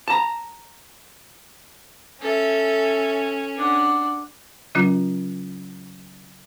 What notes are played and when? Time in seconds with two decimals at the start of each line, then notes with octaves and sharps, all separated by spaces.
0.08 A5 A#5
2.21 C#4 A4 E5
3.56 D4 F#5
4.75 C#3 F#3 C#4 F4